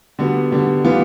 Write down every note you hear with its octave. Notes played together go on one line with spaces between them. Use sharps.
D3 G3 B3 F#4
D3 G3 B3
E3 G3 B3 F4